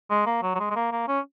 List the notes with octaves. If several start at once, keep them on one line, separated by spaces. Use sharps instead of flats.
G#3
A#3
F#3
F#3
G#3
G#3
A#3
A#3
C#4